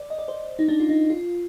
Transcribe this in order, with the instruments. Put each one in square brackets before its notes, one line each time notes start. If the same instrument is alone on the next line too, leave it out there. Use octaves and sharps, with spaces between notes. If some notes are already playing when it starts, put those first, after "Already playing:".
Already playing: [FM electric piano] C5 D5
D#5
D5
C5
D#4
D4
F4
D#4
F4